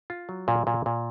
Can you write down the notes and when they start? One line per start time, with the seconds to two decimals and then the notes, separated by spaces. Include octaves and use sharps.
0.10 F4
0.29 F#3
0.48 A#2
0.67 A#2
0.86 A#2